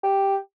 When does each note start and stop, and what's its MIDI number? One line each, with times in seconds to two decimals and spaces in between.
0.03 0.36 67